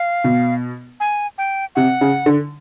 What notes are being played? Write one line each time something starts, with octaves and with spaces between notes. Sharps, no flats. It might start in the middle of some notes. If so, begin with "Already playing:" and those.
Already playing: F5
B2
G#5
G5
C3 F#5
C#3
D3